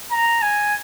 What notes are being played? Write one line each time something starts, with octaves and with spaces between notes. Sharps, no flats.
A#5
G#5